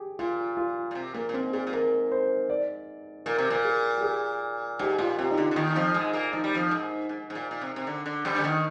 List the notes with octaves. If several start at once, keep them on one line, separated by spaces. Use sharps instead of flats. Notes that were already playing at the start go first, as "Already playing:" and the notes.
Already playing: G4 G#4
A#2 F4
F4
A#2
C3
A#2 A#3
A#2
G#2 C4
A#2 G#4
A#2
G#2 A#4
C5
D5
A#2 A#4
C3
A#2 A#4
G#4
G4
G#4
G#2 G4
A#2 F4
C3 G4
D#4
D3 F4
D3
D#2 D#3 D#4
F2 F3
G#2 G#3
A#2 A#3
F3 D#4
G3
F2 F3
G#2
G#2
G#2
A#2
A#2
C3
C3
D3
D3
G2 G3
D3
D#2 D#3